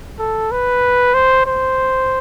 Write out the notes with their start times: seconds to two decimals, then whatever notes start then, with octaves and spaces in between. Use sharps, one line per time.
0.19 A4
0.52 B4
1.14 C5
1.46 C5